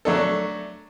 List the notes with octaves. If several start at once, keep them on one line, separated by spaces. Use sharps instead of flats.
F#3 A3 D4 A4